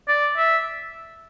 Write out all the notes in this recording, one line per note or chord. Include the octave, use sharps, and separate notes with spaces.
D5
E5